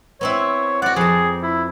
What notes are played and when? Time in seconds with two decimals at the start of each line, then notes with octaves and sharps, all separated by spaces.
0.21 B3 C4 E4 C#5
0.82 F#4 D5 F#5
0.96 F2 G#4 A5
1.43 E4